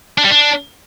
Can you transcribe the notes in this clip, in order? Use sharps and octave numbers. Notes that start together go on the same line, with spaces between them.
D4
G3
D4